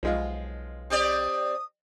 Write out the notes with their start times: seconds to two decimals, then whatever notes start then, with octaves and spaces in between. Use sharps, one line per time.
0.03 B1 F3 G#3 F4
0.90 C4 G4 D5 D#6